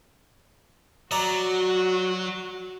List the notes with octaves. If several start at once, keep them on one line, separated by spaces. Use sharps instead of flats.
F#3 F#4 D5 A#5